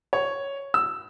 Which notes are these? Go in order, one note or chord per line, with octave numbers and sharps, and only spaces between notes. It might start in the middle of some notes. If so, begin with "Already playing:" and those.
C#5
E6